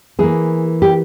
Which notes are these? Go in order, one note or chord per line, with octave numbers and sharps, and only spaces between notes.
E3 A#3 G#4
G4